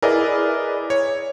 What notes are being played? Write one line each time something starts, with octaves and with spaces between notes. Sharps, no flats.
E4 G#4 A#4 B4 D5 D#5
C#5